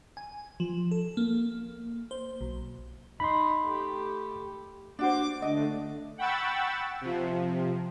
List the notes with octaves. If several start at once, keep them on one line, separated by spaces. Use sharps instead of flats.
G#5
F3
A4
A#3
C5
B1
D#4 B5 C6
A3 G4
D4 F#4 C5 D6
D3 A3 D4 D#5
F#5 G5 B5 C#6 E6 A6
C3 F3